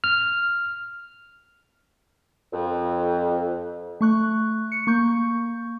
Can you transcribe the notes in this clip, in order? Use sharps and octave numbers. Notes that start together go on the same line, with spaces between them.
F6
F2
A3 C#6 F#6
C#7
A#3 C#6 G6